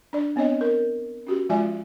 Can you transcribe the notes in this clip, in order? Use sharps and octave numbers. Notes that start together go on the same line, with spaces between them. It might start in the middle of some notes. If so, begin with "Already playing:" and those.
D4 D5
B3 C4 D4 C#5 D#5
A#4
C#4 F#4 G4
F3 G#3 F4 D5 E5 G#5